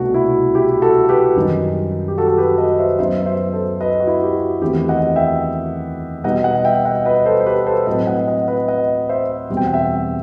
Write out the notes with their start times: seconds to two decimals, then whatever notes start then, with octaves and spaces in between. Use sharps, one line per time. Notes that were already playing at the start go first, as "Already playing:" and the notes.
Already playing: C2 B2 A3 D#4 F#4
0.14 E4
0.55 E4 G4
0.82 F#4 A4
1.09 G4 B4
1.36 F#2 D#3 G3 D#4
2.08 G4
2.18 F#4 A4
2.28 A4
2.38 G4 B4
2.58 B4 D#5
2.79 C5 E5
2.99 F#2 F#3 B3 D#4 C5 E5
3.26 C5 E5
3.53 A4 C5
3.80 B4 D#5
4.00 F#4
4.07 E4
4.23 G4
4.34 F#4
4.61 E2 D#3 A3 C4 E4 G4
4.89 D#5 F#5
5.16 E5 G5
6.24 B2 G3 B3 D#4 D#5 F#5
6.44 D#5 F#5
6.65 E5 G5
6.85 D#5 F#5
7.05 B4 D#5
7.26 A4 C5
7.40 C5
7.46 G4 B4
7.66 A4 C5
7.87 A2 F#3 C4 B4 D#5
8.07 D#5 F#5
8.28 D#5 F#5
8.48 B4 D#5
8.68 D#5 F#5
9.09 C5 E5
9.50 E2 B2 G3 C4
9.57 G5
9.66 F#5
9.73 E5 G5